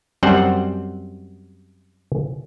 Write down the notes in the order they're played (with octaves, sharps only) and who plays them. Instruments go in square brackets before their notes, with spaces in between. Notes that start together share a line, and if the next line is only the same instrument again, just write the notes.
[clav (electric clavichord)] F#2 G3 C4 C5 F#5